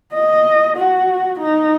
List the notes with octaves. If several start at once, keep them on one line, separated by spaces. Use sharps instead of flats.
D#5
F#4
D#4